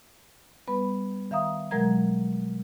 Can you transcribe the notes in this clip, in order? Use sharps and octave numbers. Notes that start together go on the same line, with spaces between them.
G3 B3 B4 B5
D#3 E5 F5 A#5 D#6
B2 F#3 G#3 A#4 A#5 G#6